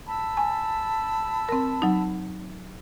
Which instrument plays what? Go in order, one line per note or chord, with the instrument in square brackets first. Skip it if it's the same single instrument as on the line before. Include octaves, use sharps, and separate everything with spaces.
[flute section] A5 B5 E6
[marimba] G#5
C4 A#4
F#3 D#4